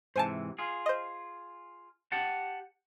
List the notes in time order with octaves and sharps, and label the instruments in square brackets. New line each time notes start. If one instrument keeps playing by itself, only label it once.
[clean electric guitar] G#2 C3 E3 [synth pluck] C5 G#5 A5
[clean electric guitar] F4 G#4
[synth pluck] C5 D#5
[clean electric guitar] G4 F#5 A5